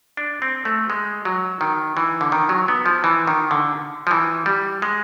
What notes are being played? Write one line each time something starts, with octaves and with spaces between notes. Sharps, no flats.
D4
C4
A3
G#3
F#3
D#3
E3
D3
D#3
F#3
B3
F3
E3
D#3
D3
F3
E3
G3
G#3